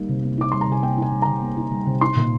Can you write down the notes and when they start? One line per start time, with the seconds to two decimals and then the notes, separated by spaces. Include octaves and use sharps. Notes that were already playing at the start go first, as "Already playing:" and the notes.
Already playing: G3 A#3 D#4
0.09 C3
0.23 A#3
0.38 D#4 D6
0.52 G3 C6
0.61 A#5
0.68 C3 G#5
0.82 A#3 G5
0.97 D#4 G#5
1.12 G3
1.22 C3 A#5
1.42 A#3
1.57 D#4
1.71 G3
1.86 C3
2.01 D#4 C6
2.16 A#2